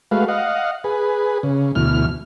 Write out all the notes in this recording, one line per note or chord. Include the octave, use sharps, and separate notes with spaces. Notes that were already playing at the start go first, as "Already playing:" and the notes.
G#3 A3 F#4 B4 F5
D#5 F5 F#5
G#4 B4
C#3
D2 B2 E3 F6